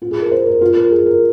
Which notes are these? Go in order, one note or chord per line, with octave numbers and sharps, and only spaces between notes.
F4
G#4
A#4
C5
A#4
F4
A#4
G#4
A#4